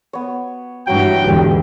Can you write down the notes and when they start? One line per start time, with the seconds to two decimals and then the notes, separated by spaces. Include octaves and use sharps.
0.13 B3 C#5
0.87 G2 E3 F#3 F#4 G5
1.24 E2 G#2 D3 G4